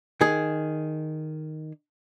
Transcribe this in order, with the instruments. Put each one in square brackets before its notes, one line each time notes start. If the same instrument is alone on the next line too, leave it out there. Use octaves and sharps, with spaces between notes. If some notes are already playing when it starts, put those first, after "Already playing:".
[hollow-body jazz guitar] D#3 G#4